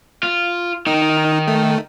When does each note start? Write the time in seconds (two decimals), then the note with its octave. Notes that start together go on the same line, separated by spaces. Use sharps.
0.23 F4
0.87 D#3 D#4
1.48 A3